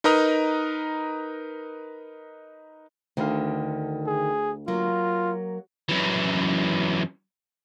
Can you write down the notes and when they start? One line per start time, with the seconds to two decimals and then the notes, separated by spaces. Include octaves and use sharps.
0.04 D#4 A#4 B4 D#5 A#5 D#6
3.17 D2 D3 D#3 F5
4.07 G#4
4.68 F#3 A#3 F4
5.89 F#2 E3